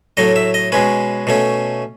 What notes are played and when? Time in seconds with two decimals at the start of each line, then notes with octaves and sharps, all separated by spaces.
0.17 A2 F#3 A3 D#5
0.36 E5
0.54 D#5
0.72 B2 G#3 C#4 B4
1.27 B2 A3 C#4